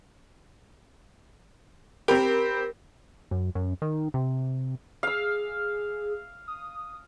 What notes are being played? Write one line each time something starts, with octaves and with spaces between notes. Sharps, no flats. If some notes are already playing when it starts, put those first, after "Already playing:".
C4 G4 A#4 B5
F#2
F#2
D#3
C3
G#4 F5 E6
D#6